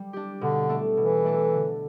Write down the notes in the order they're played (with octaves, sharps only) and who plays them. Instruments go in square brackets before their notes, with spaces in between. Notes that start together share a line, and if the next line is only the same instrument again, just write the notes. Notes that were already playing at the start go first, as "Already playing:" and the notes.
Already playing: [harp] G3
D4 G4
[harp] B2 [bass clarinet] D3
[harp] A3 D4 A4
[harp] B2 [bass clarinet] E3
[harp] A3 D4 A4
D3